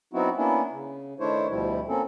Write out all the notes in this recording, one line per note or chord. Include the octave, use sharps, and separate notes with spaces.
F#3 B3 C4 D#4 E4 F#4
A#3 B3 C#4 D4 E4
C#3
D#3 A3 D4 E4 C5 C#5
D2 B2 F3 G3 E4
A#3 C4 C#4 A4